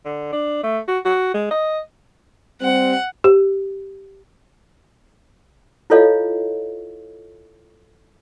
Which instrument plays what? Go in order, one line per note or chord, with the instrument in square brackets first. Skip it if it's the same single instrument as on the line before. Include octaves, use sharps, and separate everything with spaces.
[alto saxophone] D3
D4
A3
F#4
F#4
G#3
D#5
[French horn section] G3 C4 [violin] F#5
[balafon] G4
[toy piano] E4 F4 A4 C#5 D#5 F5